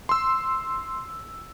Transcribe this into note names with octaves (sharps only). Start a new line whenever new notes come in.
C6 E6